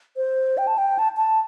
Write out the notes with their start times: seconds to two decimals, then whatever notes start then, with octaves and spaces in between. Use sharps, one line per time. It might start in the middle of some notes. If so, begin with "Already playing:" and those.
0.17 C5
0.58 G5
0.67 A5
0.78 G5
0.99 A5
1.17 A5